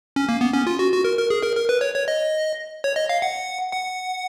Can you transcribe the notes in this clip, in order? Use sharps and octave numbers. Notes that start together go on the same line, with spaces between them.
C#4
A#3
B3
C#4
F4
F#4
F#4
A#4
A#4
G#4
A#4
A#4
B4
C#5
C#5
D#5
C#5
D#5
F5
F#5
F#5